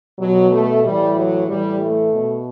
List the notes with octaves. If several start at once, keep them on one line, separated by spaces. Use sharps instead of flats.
B2 F#3
A3
A2 E3 G3
F#3
A2 E3 G3
A3
B2